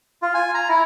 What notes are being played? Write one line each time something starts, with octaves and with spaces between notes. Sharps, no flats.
F4
G#5
A#5
E4